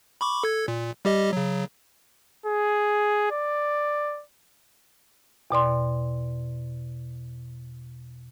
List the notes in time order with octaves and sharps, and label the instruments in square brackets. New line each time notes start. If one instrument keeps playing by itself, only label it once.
[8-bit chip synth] B5 C#6 D6
A4 G#6
A#2
G3 G4 D#5
C#3 F#3
[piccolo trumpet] G#4
D5
[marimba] E2 B2 D5 C6